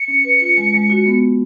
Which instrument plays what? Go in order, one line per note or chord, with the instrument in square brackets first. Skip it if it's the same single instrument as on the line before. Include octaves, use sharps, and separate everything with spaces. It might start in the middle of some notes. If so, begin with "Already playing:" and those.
Already playing: [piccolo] C#7
[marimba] C#4
B4
F4
G#3
G#3
F#4
B3